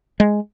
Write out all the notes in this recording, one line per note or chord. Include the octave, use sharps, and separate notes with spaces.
G#3